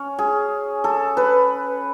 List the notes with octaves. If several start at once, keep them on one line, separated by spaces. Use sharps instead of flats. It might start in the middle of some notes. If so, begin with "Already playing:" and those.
Already playing: C#4
G#4
A4
B4